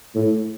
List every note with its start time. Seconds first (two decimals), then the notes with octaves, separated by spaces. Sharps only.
0.15 A2